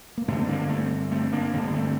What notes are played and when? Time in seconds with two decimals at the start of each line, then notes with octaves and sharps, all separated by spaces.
0.17 A#3
0.28 G2 D3 A3 C4
0.49 A#3 D4
0.62 A#3
0.69 A3 C4
1.11 A3 C4
1.32 A#3 D4
1.53 G2 D3 C4
1.64 A#3
1.73 A3 C4